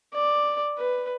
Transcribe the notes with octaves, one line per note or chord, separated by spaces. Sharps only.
D5
B4